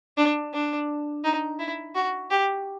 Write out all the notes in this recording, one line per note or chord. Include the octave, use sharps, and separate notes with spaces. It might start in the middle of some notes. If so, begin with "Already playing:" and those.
D4
D4
D#4
E4
F#4
G4